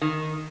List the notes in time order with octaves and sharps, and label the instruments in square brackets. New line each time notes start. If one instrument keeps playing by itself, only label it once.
[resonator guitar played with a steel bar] D#3